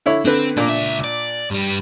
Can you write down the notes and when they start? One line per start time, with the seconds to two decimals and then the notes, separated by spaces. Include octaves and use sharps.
0.06 D3 E4 C#5
0.25 D3 C4 B4
0.57 A#2 A#3 D4
0.69 C#2 E5
1.04 D5
1.51 G2 G3